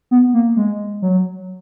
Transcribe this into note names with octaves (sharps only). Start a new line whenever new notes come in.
B3
A#3
G#3
F#3